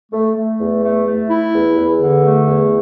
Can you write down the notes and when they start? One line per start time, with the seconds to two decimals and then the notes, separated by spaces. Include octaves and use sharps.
0.12 A3
0.35 A3
0.59 E2
0.83 A3
1.06 A3
1.29 E4
1.53 E2
1.76 E2
2.00 D3
2.24 A3
2.46 E2